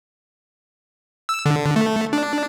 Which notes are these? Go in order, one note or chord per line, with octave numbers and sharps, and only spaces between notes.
E6
D3
A3
D4